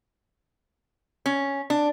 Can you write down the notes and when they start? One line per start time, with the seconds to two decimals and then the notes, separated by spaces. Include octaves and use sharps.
1.26 C#4
1.70 D4